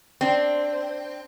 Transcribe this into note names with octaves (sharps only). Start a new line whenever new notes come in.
C4 D4